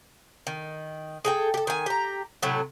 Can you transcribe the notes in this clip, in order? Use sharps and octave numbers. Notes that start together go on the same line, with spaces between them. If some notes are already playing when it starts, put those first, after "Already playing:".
D#3
G#4 A4 G5
G4 A4
D#3 G#5
G4 A#5
A2 C3 F#3 A3